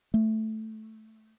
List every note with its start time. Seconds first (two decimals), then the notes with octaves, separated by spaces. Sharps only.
0.14 A3